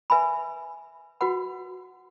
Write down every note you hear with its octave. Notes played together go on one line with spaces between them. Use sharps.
B4 E5 G#5 B5
F#4 B4 F#5 B5